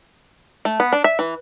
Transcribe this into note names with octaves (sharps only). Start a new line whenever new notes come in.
A3
B3
D4
E5
E3